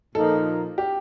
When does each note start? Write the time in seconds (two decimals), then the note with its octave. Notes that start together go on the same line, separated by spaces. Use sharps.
0.15 A#2 F3 A#3 D#4 A4 A#4
0.78 G4